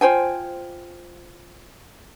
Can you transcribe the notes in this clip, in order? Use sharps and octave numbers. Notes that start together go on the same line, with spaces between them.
F4 C5 G5 G#5